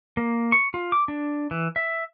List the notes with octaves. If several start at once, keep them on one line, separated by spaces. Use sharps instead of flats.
A#3
C#6
F4
D6
D4
E3
E5